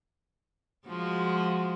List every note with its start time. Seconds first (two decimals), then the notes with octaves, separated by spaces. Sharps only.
0.87 F3 G#3 F#4